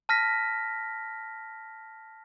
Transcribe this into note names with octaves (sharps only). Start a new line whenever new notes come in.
A5 F6 A#6 B6